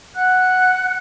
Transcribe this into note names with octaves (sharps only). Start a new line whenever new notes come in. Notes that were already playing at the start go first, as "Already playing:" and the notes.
F#5 F#6